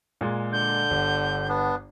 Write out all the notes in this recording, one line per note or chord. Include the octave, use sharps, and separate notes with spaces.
A#2 G#3
D3 G6
G1
B3 D4